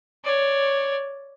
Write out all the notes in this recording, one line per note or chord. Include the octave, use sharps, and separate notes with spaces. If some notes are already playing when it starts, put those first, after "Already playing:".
C#5 D5